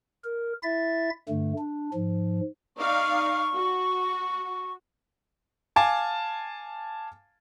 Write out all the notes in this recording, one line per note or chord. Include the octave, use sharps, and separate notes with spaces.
A#4
E4 E5 A6
G2 D3 A3
D4
G#2 F3
D#4 D5 F5 C#6
F#4
F5 G#5 A5 D6